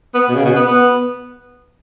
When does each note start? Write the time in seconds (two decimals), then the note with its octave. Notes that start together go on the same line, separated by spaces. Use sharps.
0.15 B3
0.29 B2
0.36 C#3
0.45 B2
0.56 B3
0.66 B3